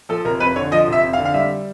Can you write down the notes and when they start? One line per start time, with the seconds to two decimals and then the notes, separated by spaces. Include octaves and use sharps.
0.09 F3 A4
0.25 F1 A#4
0.40 F2 B4
0.56 D3 C#5
0.71 F3 D#5
0.87 F1
0.92 E5
1.03 F2
1.13 F5
1.18 D3
1.25 F5
1.34 G3 E5